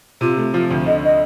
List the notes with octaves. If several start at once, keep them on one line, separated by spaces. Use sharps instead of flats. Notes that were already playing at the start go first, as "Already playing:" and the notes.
C3 F4
A3
F3 F4
D2
D3 D#5
D#5